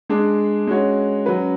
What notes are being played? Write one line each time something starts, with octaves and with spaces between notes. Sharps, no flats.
G#3 D4 G#4
G#3 C#4 F#4 C#5
F#3 C#4 F#4 B4